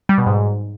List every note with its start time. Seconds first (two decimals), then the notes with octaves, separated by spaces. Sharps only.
0.09 G3
0.18 B2
0.27 G#2